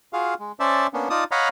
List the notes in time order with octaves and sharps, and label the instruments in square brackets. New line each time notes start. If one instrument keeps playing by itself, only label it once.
[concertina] F4 F#4 G#4 F5
G#3
C#4 C5 D5 E5 A5
A#3 B3 C#4 D4
D#4 F4 D5 A5 D#6
C#5 D#5 F5 F#5 A#5 B5